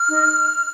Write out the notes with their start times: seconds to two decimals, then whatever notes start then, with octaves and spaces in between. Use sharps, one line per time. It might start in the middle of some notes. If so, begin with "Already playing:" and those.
Already playing: F6
0.08 D#4